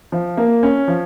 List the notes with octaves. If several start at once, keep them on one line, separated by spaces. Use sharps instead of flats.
F3
A#3
C#4
F3